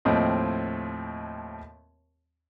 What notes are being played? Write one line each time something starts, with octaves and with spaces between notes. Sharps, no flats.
D#2 A2 F3 C4 D#5